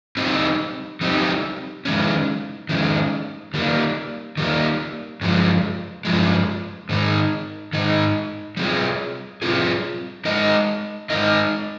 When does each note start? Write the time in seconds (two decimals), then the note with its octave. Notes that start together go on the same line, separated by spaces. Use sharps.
0.17 G3 C4 D#4 G4
1.01 G3 C4 D#4 G4
1.85 D#3 G#3 C#4
2.69 D#3 G#3 C#4
3.54 D#3 G3 A#3
4.37 D#3 G3 A#3
5.21 G2 F3 G#3
6.05 G2 F3 G#3
6.89 G#2 D#3 G#3 D#4
7.73 G#2 D#3 G#3 D#4
8.57 G3 C4 F4 G#4
9.42 G3 C4 F4 G#4
10.25 G#3 D#4 A#4 D#5
11.10 G#3 D#4 A#4 D#5